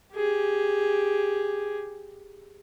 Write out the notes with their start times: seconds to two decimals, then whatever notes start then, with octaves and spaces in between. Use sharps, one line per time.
0.14 G4 G#4